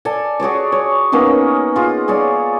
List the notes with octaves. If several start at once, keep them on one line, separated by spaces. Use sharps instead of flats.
A4 D5 G#5
F#4 G#4 C#5 D5
C#5
A#3 B3 C#4 D#4
F4 G#4
G#4 C#5 D5 G#5